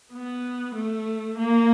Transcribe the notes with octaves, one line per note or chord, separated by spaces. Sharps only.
B3
A3
A#3